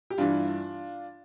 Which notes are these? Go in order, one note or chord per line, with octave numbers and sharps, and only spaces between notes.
G4
G2 E3 D4 F4